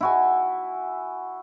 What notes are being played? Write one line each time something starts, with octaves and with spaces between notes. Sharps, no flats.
E4 F#4 G#5